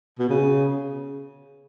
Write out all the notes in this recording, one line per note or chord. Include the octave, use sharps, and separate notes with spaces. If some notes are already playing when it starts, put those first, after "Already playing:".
B2
C#3